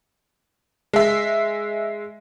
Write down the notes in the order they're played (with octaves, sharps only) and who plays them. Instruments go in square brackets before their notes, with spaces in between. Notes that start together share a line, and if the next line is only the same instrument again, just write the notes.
[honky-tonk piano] G#3 E5